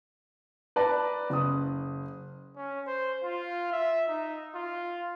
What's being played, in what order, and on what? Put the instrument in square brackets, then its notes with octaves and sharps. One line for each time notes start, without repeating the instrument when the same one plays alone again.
[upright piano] B4 D5 A5 A#5
F#1 D#6
[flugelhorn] C#4
C5
F4
E5
D#4
F4